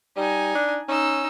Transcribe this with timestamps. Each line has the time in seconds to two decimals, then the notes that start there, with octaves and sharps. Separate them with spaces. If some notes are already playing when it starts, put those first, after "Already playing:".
0.17 G3 D#4 G#5
0.55 D4
0.89 C#4 D#4 E6